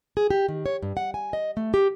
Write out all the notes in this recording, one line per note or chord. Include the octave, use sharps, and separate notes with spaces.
G#4
G4
D#3
C#5
G2
F#5
G#5
D#5
A3
G4